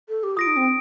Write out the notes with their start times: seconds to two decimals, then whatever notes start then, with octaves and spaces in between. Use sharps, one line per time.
0.09 A4
0.23 G4
0.37 F4 D#6 A#6 D7
0.47 D#4
0.57 C4